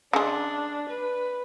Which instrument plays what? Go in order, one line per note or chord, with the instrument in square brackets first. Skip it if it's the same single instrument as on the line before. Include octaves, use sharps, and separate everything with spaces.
[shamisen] C#3 G#3 [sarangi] D4
[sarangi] B4